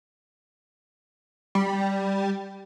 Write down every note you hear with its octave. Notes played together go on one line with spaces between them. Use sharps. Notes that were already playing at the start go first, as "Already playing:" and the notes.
G3